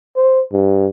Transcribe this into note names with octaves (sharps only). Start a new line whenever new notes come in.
C5
G2